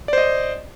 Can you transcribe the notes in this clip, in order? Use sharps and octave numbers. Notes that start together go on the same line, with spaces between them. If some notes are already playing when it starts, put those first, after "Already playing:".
C5 D5 D#5